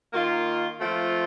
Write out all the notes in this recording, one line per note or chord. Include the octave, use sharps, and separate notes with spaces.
D#3 A#3 F4
F3 A3 C4 F4